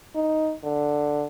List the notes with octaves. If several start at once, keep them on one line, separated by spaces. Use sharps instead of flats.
D#4
D3